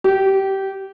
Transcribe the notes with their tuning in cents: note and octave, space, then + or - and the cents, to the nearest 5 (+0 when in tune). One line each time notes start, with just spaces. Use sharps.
G4 -20